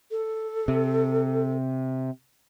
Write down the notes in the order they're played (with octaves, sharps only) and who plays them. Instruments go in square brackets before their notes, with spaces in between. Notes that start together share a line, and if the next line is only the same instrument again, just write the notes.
[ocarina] A4
[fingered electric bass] C3